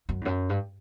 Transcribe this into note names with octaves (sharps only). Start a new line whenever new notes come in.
F#2
E2
F#2
G2